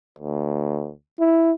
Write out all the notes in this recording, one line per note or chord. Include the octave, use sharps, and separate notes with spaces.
D2
E4